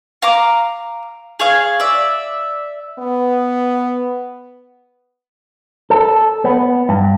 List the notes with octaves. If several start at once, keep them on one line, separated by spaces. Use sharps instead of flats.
F5 A#5 D6
G#4 C#5 F5
D5 E5
B3
A4
B3
G2